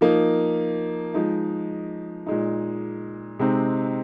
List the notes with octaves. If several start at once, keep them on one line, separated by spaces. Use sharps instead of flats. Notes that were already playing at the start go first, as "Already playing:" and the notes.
F3 A#3 D#4
F3 G#3 D#4
A#2 G#3 D#4
C3 G#3 C4 D#4